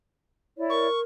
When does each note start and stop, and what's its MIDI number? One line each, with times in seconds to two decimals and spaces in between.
0.57 0.87 64
0.57 0.87 73
0.57 0.87 74
0.70 1.03 70
0.70 1.00 85